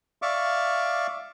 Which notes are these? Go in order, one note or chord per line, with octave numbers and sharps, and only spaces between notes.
D5 E5 F5 C#6 D6